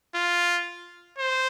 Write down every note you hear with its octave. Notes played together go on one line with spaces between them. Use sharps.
F4
C5